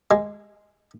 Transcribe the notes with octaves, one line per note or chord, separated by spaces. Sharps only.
G#3